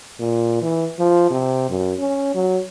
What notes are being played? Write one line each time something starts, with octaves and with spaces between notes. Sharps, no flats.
A#2
E3
F3
C3
F#2
C#4
F#3